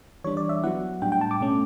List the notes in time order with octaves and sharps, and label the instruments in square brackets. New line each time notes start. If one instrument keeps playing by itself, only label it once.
[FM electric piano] E3 G3 D4 C#5
D5
E5
F#3 B3 E4 F#5
A2 G3 D4 G5
G5
A5
D6
B2 A3 C#4